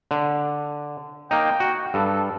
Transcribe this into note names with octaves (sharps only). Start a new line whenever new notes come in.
D3
A#3 D#4 G5
F#4
G2 A4